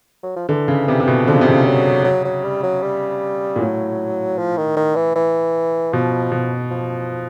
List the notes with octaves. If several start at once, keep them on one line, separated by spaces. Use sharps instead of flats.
F#3
F3
D3 E3
C#3
C3 E3
C3
B2
D3 F3
C#3
C3
C#3
F#3
F#3
F#3
G3
F#3
G3
A#2
A2 F#3
F3
D#3
D#3
E3
E3
B2 F3
B2
F3